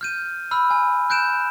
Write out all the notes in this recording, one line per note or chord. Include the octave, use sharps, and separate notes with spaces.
F6 G6 D#7
B5 E6 F6
G#5
F#6 G6 D7 E7